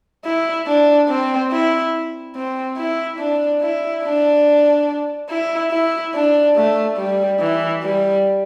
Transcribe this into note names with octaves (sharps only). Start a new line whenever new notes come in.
E4
D4
C4
E4
C4
E4
D4
E4
D4
E4
E4
D4
A3
G3
E3
G3